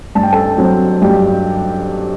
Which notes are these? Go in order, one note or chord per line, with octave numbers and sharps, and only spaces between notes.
G2 A5
G5
A4 A5
F#3 C4
G2 G4 G5